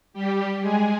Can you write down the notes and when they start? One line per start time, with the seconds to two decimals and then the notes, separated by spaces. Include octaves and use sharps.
0.13 G3 G4
0.61 G#3 G#4